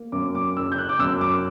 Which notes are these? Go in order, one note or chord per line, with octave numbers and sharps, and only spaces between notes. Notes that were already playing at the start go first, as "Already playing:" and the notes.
Already playing: A#3
F#2 D6
D6
F#1 E6
G6
F#6
D6
F#2 E6
D6